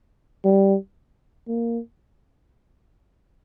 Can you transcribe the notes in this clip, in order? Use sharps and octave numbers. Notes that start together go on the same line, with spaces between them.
G3
A#3